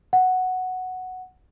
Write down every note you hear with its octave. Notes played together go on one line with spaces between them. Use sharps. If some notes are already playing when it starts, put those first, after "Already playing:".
F#5